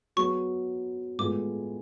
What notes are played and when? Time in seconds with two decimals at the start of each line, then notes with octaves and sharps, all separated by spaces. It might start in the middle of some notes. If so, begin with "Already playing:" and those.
0.16 F#3 B3 F#4 C#6
1.18 A2 G#3 B3 F4 G#4 D6